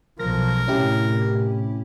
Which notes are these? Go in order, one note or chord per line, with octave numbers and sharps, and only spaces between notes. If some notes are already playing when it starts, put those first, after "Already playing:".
B1 F3 A#4 A#6
A2 C3 C#4 E4 G4